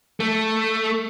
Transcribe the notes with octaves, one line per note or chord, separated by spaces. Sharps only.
A3